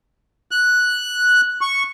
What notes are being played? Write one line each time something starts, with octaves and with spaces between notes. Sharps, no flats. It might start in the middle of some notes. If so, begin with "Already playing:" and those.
F#6
C#6